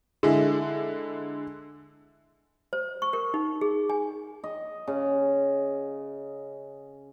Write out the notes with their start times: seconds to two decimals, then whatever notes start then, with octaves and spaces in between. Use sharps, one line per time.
0.23 D3 G#3 E4
2.73 C5
3.02 C#6
3.13 A#4
3.34 D#4
3.61 G#4
3.90 G#5
4.44 D#5
4.87 C#3